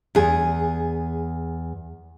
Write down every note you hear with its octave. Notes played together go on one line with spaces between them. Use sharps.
E2 G#4